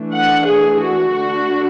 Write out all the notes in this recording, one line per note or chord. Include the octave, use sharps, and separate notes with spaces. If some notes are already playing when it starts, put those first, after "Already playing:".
Already playing: E3 A3 D4
F#5
G#4
F#4
D3 A3 D4